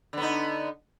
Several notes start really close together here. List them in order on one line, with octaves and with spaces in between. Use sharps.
D3 B3 D#4